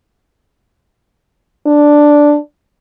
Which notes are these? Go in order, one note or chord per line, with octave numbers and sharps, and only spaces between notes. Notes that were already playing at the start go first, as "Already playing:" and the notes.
D4